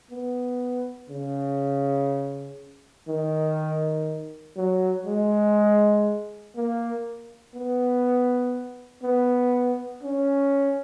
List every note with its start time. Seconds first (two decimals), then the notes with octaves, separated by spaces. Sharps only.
0.11 B3
1.09 C#3
3.08 D#3
4.57 F#3
5.06 G#3
6.55 A#3
7.55 B3
9.03 B3
10.03 C#4